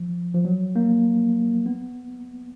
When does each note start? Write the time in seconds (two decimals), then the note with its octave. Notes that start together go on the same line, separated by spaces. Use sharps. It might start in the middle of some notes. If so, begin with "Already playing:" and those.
Already playing: F3
0.34 F3
0.45 F#3
0.76 A#3
1.66 B3